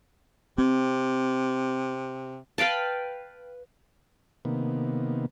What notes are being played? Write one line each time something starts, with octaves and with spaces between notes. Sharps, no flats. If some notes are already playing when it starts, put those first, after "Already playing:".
C3 C4
B4 F5 G5 A5
C3 D#3 A#3 B3